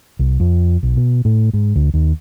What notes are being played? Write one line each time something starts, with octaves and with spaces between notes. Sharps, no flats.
C2
F2
B1
B2
A2
G#2
D2
D#2